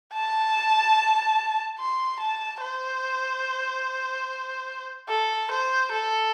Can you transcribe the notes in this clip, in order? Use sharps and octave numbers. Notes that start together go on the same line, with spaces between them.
A5
C6
A5
C5
A4
C5
A4